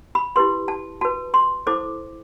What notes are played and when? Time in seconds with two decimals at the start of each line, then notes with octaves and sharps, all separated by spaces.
0.15 B5
0.36 E4 G4 B4 C6
0.68 A5
1.01 F#4 B4 A5
1.34 C6
1.67 E4 A4 C5 D6